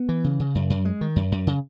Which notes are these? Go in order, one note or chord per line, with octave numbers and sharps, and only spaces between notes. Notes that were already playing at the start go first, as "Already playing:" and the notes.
Already playing: B3
E3
C#3
C#3
F#2
F#2
G#3
D#3
F#2
F#2
C#3